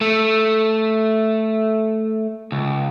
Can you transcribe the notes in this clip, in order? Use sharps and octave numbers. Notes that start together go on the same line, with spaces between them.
A3
C#2